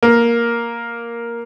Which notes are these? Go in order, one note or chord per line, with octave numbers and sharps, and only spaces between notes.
A#3